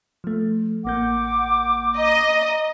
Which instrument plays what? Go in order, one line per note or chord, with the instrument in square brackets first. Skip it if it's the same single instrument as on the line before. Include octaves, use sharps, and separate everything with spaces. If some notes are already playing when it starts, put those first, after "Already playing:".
[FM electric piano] F3 A3
[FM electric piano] A1 A#3 G6 [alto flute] F#5 [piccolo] D6
[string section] D#5 [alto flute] A#5